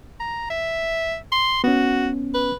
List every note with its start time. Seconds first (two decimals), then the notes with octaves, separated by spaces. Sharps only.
0.20 A#5
0.50 E5
1.32 C6
1.64 B3 C#4 F#4
2.34 B4